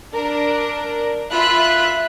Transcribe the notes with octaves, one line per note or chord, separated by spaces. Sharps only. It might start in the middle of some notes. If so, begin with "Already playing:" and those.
D4 A#4
F4 E5 B5 F#6